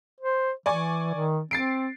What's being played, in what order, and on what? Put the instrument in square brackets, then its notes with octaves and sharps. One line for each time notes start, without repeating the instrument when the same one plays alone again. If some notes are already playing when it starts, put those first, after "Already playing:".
[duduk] C5
[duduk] E3 [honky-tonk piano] D5 G#5 C#6
[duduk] D#3
[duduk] C4 [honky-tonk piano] A6 C7 D7